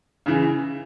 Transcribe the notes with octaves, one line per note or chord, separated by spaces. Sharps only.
C#3 E3